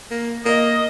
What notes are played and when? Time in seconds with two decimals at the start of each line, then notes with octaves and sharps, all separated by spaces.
0.11 A#3
0.45 A#3 D#5